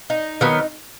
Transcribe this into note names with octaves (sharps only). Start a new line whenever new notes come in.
D#4
D#3 F#3 B3